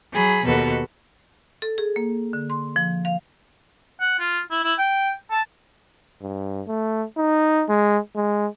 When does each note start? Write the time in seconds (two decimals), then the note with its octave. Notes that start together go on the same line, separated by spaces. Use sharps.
0.12 F#3 G#4 B5
0.44 D#2 B2 F#4 A4 B4
1.62 A4
1.78 G#4
1.96 A#3
2.33 D3
2.50 C6
2.76 F3
3.05 F5
4.00 F#5
4.19 F4
4.51 E4
4.63 E4
4.78 G5
5.31 A5
6.22 G2
6.67 A3
7.17 D#4
7.69 G#3
8.16 G#3